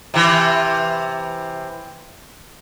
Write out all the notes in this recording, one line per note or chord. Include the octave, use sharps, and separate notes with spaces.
C3 E3